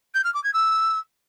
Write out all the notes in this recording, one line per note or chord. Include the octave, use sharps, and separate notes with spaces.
G6
F6
D6
G#6
E6